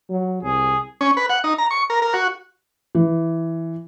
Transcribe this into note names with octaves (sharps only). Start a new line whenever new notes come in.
F#3
C2 G#4
C#4
B4
F#5
D#4
A#5
C#6
A#4
A#4
F#4
E3